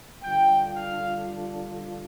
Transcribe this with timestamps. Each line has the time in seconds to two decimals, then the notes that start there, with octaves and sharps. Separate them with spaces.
0.23 D3 G3 D4 F4 G5
0.76 F5